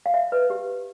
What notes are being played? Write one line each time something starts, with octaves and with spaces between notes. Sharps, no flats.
F5
E5
B4
G4